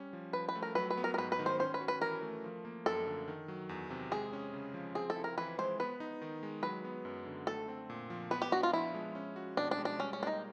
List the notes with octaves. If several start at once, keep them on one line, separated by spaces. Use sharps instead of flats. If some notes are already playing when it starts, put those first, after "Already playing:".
Already playing: G3 C#4
F3
F3 B4
B4
A3
A#4
F#3 B4
B4
B3
A#4
A#4
G#2 B4
B4
D#3
C5
C#4 C5
B4
F#4
B4
E3 A#4
A3
F3
A#3
F#2 A4
D3
D#3
F#3
E2
C3
G#3 G#4
C#4
C#3
F3
C4 G#4
A4
E4
A#4
E3 B4
G#3 C5
B3 B4
D#4
D#3
G#3
F#3 B4
B3
F#2
D3
A3 A4
C4
A#2
F3
B3 B4
G4
D4 F#4
F4
F3 E4
G#3
C#4
F#4
B2 D4
D4
G#3
D4
G3 C#4
C#4
A#3 D4
D#4